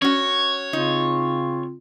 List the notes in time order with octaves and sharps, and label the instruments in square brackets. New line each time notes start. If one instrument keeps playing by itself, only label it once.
[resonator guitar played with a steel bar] C#4 F#4 [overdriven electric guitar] C#5
[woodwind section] C#3 C4 F4 [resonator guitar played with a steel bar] D#4